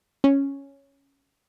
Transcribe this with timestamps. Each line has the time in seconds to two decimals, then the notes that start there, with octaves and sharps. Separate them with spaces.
0.24 C#4